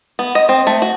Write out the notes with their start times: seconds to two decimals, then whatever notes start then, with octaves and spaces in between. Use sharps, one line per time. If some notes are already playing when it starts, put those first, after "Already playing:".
0.19 B3
0.35 D#5
0.49 C4
0.67 A3
0.82 F#4